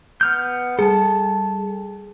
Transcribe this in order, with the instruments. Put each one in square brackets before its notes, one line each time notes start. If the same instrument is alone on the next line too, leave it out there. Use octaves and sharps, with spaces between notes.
[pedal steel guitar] B3 F6 G6
[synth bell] G3 G#4 [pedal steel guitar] A4 A5